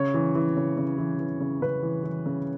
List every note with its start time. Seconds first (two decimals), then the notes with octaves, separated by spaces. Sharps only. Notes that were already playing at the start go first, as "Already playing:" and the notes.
Already playing: C#3 C#5
0.14 E3
0.35 E3
0.57 C#3
0.77 C#3
0.98 E3
1.19 E3
1.40 C#3
1.62 C#3 B4
1.83 E3
2.04 E3
2.26 C#3